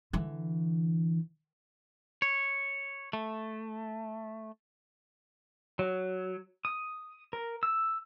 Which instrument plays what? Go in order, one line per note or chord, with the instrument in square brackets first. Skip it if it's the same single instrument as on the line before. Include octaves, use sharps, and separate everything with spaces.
[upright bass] D3 E3
[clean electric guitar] C#5
A3
[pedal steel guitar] F#3
D#6
A#4
E6